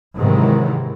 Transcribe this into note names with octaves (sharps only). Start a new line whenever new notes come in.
G#2 C3 D#3 E3 F#3